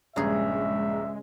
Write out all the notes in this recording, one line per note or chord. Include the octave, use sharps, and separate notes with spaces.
A#1 G2 C#3 G#3 G#4 E5 A#5